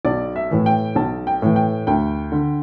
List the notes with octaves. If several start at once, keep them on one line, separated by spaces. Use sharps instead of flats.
B1 D5
E5
A2 E3
G5
B1 A5
G5
A2 E3
G5
D2 G5
D3